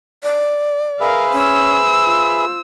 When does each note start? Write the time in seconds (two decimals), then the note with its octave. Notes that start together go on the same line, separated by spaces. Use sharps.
0.23 D5
1.00 G#4 A#4 B4 E5 F5
1.33 C#4 C5 E6
2.05 F4